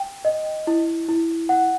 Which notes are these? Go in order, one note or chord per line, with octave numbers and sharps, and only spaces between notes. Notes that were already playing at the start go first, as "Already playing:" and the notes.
Already playing: G5
D#5
E4
E4
F#5